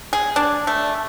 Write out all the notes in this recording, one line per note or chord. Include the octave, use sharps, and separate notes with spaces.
G#4
D4
A3